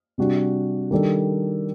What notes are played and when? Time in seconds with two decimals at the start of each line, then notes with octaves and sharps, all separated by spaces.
0.18 C3 G3 D4 F#4
0.91 D#3 G3 D4 A4